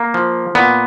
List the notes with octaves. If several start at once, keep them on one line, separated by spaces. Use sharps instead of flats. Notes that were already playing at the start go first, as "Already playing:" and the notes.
Already playing: A#3
F3
A#2 B3